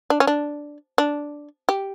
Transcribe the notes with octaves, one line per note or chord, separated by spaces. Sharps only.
D4
C#4
D4
D4
G4